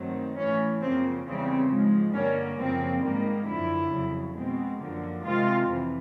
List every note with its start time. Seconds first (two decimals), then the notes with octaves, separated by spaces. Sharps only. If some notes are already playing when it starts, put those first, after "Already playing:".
Already playing: G2 D#3 F#3 A3 C4
0.36 A2 E3 A3 C#4
0.81 F#2 C#3 F3 A#3 C4
1.25 E2 C#3 E3 G3 C4
1.70 G#2 F3 G#3
2.13 G2 D3 G3 A#3 C#4
2.59 F#2 C#3 F3 A#3 C4
3.02 G#2 D#3 G3 A#3
3.46 F#2 D3 F3 E4
3.91 F2 C#3 F#3
4.36 B2 G#3 C4
4.80 F#2 D3 F3 A#3
5.23 C3 D#3 G#3 C4 F4
5.69 F2 C3 E3